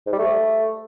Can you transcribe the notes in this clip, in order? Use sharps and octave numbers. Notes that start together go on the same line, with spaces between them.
G#2
G3
A3